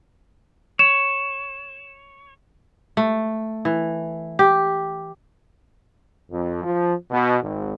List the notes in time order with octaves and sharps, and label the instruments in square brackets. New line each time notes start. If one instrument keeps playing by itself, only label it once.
[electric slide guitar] C#5 [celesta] E7
[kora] A3
E3
G4
[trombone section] F2
F3
B2
G#1